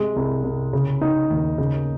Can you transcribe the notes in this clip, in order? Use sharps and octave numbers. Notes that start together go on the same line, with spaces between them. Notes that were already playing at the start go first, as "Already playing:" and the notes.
Already playing: C3 G#3
C2
C2
C#3
D#4
D#2
C#3